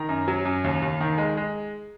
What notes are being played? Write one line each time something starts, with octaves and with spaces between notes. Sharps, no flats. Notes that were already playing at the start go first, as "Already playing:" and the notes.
Already playing: D#3 A#5
F#2
F#3
F#2
D#2
D#2
D#3
G#3
G#3